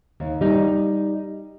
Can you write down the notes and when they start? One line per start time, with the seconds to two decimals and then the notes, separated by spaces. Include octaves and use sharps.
0.20 D#2
0.41 G3 D#4